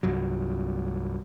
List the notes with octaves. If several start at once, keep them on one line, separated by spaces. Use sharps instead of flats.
C2 G2 F#3